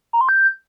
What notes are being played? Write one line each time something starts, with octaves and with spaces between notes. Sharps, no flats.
A#5
C6
G6